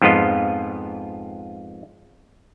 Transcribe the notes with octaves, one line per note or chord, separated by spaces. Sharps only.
F2 G#2 F3 B3 F4 D#5